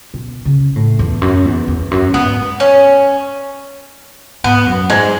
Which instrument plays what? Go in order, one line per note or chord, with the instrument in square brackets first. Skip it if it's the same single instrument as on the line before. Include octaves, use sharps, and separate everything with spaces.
[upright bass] B2
C#3
A2
E2
F#2
E2
E2
F#2
[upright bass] G#2 [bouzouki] B3
[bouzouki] C#4
[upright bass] G#2 [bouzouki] B3
[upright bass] F#2
[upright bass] G#2 [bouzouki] G#3